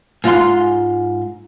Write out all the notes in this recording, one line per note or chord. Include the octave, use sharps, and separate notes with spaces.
G#2 F4 F5 C6